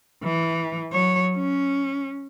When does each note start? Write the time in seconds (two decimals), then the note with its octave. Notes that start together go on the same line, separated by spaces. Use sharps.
0.23 E3
0.92 F#3 C#5
1.36 C#4